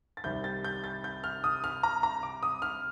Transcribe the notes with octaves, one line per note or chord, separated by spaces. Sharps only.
A6
C2 C3 D#3 G3 G6
A6
G6
A6
G6
F6
D#6
F6
A#5
A#5
D6
D#6
F6